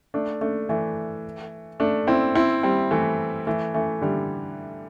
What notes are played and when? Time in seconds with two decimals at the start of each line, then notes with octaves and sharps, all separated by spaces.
0.14 A3 D4
0.41 A3 D4
0.69 E3 A3
1.80 A3 D4
2.07 C4 E4
2.35 C4 E4
2.63 G3 C4
2.91 E3 A3
3.47 E3 A3
3.74 E3 A3
4.02 D3 G3